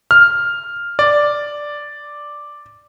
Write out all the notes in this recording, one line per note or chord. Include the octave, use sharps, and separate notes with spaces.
F6
D5